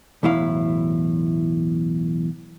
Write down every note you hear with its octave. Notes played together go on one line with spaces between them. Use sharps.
B1 E2 A2 E4 F5